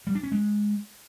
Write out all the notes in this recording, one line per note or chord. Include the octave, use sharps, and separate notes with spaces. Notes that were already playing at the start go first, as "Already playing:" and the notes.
G3
D4
C#4
G#3